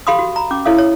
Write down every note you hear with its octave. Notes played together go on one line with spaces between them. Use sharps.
G4 A4 F5 B5 C6 D#6
F#4
A#5 B5
C#4 D6
E4 A4 C#5 E5 F5 D#6
C#5